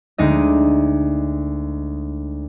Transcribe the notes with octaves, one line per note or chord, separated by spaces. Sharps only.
D2 G#3 D#4 D#5